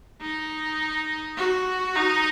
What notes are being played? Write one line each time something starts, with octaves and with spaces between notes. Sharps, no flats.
D#4
F#4
D#4